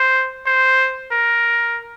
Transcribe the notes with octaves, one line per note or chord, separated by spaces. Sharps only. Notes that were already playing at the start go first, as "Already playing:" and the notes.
Already playing: C5
C5
A#4